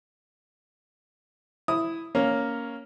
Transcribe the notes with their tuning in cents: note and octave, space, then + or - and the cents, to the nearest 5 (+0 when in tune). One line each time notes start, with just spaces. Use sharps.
E4 +0 D#6 +5
A#3 +0 C#4 +5